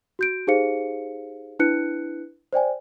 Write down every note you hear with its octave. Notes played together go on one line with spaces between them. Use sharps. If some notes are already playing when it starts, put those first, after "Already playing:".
F#4 G6 D7
D#4 G4 G#4 C5 F5 C#7
D4 E4 B4 F#6 C#7
C5 D5 G5 G#5